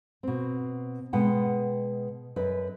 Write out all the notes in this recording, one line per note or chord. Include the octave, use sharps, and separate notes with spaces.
B2 C4
B2 G#3 B4 F#5 G5
F#2 B4 D#5